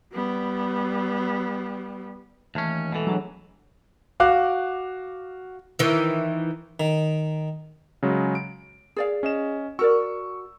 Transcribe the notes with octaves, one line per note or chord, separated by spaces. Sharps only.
G3 B3
D#2 E3 A3 C#4
B2 E3 G#3 A4
F#3 D4 G#4
F#4 F5 D6 F#6
D#3 E3
D#3
C#3 F#3 G#3
D7
G#4 D5 F5
C#4 D#5 E7
F#4 A#4 D5 C#6 E6